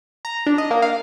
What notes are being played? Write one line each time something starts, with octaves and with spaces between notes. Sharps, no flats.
A#5
D4
D#5
A#3
F5